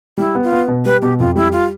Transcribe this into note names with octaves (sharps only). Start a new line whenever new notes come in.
G3 E4
B3
F4
B3
B2
G3 B4
B2 G4
F2 F4
G3 E4
F4